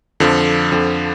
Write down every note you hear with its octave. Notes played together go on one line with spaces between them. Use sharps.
F2 D3 F3
F2 D3 F3